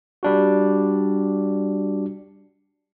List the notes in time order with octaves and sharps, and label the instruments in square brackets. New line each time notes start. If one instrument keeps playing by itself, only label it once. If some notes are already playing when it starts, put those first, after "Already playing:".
[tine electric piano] G3 D4 F#4